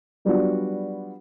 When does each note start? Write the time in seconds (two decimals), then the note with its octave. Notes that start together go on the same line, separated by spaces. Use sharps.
0.25 F#3 G3 B3 D4 F4 F#4